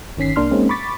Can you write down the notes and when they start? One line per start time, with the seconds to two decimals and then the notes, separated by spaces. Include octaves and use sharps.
0.17 G1 D#3 C#4 B6 C7
0.36 C2 C3 A#3 D4 C6 F6
0.51 G#3 A#3 C4 C#4 D#4
0.69 B5 C#6 D6 A6 B6